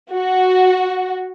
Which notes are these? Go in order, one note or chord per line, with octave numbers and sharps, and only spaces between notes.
F#4